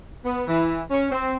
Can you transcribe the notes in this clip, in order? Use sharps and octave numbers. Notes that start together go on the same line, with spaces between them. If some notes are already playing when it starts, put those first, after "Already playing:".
B3
E3
C#4
C4